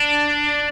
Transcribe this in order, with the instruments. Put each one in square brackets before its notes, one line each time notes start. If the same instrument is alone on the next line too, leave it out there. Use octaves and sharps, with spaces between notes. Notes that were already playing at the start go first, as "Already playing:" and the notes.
Already playing: [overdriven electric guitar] D4